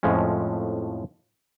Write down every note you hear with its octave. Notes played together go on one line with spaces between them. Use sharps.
F2 A2 F3 G#3 C#4